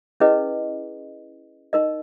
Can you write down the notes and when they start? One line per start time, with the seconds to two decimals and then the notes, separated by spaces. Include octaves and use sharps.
0.20 C#4 E4 G#4 B4 D#5
1.73 D#4 A#4 D#5